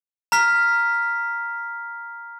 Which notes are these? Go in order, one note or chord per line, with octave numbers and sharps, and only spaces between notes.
A#5 F6 B6